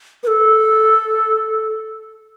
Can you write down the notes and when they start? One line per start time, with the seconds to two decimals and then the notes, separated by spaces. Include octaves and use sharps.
0.23 B4
0.27 A4